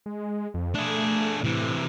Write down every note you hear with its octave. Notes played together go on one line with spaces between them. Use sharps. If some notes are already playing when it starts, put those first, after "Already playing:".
G#3
F2
A3 D4 G#4
A2 C3 E3